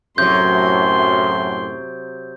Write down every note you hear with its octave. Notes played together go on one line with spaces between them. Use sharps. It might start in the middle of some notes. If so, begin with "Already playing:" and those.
F#2 A2 C3 F#3 C6 G6